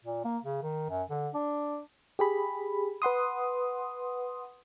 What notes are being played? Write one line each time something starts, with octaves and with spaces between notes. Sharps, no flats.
A#2
A#3
C#3
D#3
F#2
D3
D4
G4 G#4 B5
B4 F#5 C6 D#6